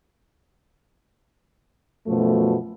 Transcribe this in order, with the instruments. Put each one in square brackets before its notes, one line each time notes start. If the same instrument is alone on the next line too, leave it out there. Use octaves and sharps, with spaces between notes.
[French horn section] F#2 B2 F3 A3